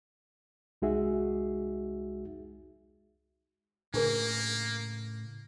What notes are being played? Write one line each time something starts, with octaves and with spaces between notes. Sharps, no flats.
C2 G#3 D#4 F#4 G#4 E5
A2 C#3 A#3 D4 G#4 A#4